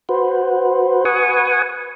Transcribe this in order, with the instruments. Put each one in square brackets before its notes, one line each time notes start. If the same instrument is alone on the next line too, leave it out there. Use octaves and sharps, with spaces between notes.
[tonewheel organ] F#4 B4 C5
B4 F#5 G#5 C#6 D#6